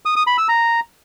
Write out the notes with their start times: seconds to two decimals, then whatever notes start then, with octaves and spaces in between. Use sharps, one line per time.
0.06 D#6
0.16 D#6
0.27 B5
0.38 E6
0.48 A#5